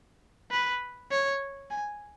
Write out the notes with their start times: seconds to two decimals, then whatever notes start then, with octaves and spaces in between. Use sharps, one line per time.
0.51 B4
1.11 C#5
1.70 G#5